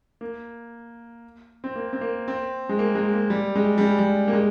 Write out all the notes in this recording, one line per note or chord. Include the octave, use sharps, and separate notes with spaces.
A#3
C4
A#3
C4
A#3
C4
G#3
A#3
G#3
A#3
G3
G#3
G3
G#3
G3
A#3
G#3